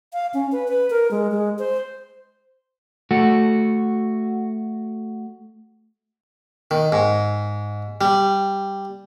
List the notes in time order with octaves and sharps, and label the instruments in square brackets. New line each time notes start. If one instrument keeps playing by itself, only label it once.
[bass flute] F5
C#4
B4
B4
A#4
G#3
G#3
C5
[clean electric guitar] A3 F#4
[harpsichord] D#3
G#2
G3